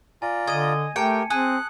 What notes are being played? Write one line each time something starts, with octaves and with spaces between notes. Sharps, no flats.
F4 D5 G#5 A#5
D3 D#5 G#6 D#7
A3 G4 A#4 G5 A5 C#7
C4 G#4 D#6 F#6